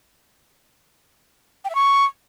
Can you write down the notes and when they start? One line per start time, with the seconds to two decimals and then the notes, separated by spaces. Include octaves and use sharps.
1.65 G5
1.70 E5
1.75 C#6